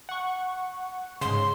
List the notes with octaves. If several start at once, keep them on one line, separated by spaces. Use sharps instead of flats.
F#5 C#6
G#2 C#3 C6